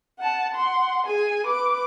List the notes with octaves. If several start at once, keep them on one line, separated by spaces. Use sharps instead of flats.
F#5 A5
F#5 C6
G#4 G#5
B4 D6